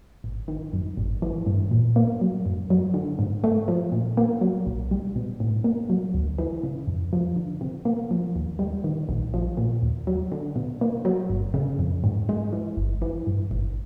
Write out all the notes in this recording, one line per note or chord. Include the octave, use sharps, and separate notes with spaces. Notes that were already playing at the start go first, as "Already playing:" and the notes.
G#1
D#3
F#2
G#1
E3
G2
A#2
A#3
F#3
F#2
F#3
D3
G#2
A3
F3
A#2
A#3
F#3
B1
G3
B2
A2
A#3
F#3
D2
E3
C#3
F2
F3
D3
C3
A#3
F3
D#2
G3
D#3
A#1
F3
A#2
D#2
F#3
D3
B2
A#3
F#3
G1
C#3
F2
G#2
G#3
E3
G1
E3
G2
G1